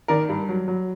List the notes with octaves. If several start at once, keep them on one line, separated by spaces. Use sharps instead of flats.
D#3 A#4 D5
G2
F#3
F#3